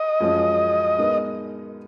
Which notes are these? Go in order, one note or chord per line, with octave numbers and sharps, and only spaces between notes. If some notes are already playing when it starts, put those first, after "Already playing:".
Already playing: D#5
F#2 F3 G#3 C#4 F4
G#3 B3 D#4 A#4